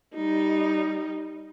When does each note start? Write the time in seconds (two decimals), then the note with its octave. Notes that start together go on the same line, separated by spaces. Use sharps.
0.15 G3 D#4